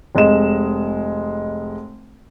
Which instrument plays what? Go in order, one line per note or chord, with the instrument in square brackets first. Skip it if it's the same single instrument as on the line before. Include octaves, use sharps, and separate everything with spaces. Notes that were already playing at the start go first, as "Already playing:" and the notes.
[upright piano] F1 G#3 D#5 E7